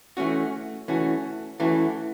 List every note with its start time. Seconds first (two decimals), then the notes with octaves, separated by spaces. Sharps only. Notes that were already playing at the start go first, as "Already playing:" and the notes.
0.17 E3 A3 C#4 F#4
0.88 E3 A3 C#4 F#4
1.60 E3 A3 C#4 F#4